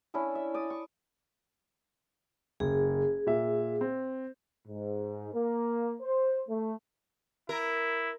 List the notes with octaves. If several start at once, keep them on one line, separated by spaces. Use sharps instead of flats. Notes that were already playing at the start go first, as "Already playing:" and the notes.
C#4 D4 E4 A4
E5
D5 D#6
C#6
F#1 G#4
A#2 E5
C4
G#2
A#3
C5
A3
E4 A#4